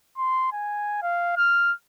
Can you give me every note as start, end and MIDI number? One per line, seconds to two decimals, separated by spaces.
0.18 0.51 84
0.53 0.98 80
1.02 1.34 77
1.37 1.73 89